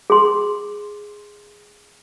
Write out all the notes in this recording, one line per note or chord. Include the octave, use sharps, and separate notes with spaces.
G#4 C6